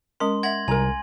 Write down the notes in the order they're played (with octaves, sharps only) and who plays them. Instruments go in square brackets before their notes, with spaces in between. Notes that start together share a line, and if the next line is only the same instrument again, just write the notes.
[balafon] G#3 C#4 A#4 [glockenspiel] C6
[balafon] E5 F#5 [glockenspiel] G#6 A#6 F#7
[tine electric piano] C2 [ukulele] A#4 A#5 [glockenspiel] G#5